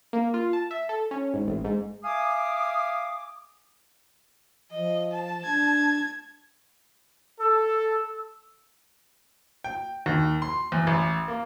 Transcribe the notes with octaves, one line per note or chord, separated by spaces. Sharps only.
A#3
F4
A5
E5
A4
C#4
G#1
A1
G#2
E5 F5 G#5 D6 D#6
F3 D#5
A5
D4 G#6
A4 E6
G5
D#2
C6
E2
A1
A#3